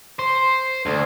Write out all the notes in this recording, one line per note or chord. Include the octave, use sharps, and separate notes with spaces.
C5
D2